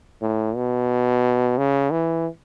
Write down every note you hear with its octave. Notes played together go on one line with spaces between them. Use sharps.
A2
B2
C#3
E3